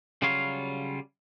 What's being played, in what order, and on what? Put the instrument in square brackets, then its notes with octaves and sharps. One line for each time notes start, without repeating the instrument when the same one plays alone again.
[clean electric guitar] C#3 F#3 G3 F4 C#5 F5